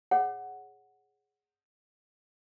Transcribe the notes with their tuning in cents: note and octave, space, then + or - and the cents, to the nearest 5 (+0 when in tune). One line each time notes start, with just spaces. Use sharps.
G#4 +0 C#5 +0 F#5 +0